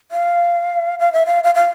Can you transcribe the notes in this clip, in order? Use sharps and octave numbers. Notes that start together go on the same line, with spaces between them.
F5
F5
E5
F5
F5
F5